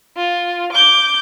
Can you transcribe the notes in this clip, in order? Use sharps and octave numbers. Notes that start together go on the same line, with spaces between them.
F4
D6 G6